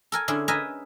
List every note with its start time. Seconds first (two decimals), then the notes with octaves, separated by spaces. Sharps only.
0.12 A4 A#4 G#5
0.28 D3 C#4 E4 G#4
0.48 A#4 B4 D#5 E5 G#5 A#5